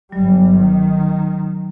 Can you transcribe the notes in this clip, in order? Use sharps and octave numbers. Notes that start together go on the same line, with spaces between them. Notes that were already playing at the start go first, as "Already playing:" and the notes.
G1 F#3 G3
D#3